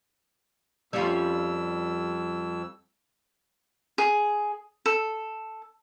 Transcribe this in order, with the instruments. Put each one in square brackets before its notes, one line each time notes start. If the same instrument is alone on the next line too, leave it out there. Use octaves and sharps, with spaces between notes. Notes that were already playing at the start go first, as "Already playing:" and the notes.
[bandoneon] F2 E6 [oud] G3 C#4 F4
[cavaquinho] G#4
A4